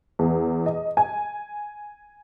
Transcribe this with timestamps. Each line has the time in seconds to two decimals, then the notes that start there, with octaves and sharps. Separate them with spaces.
0.19 E2
0.66 D#5
0.97 G#5